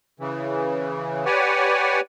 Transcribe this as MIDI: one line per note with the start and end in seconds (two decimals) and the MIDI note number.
0.20 1.25 49
0.20 1.25 52
1.26 2.00 67
1.26 2.00 71
1.26 2.00 73
1.26 2.00 74
1.26 2.00 78
1.26 2.00 80